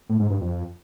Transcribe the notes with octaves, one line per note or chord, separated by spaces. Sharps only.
A2
G#2
G2
F2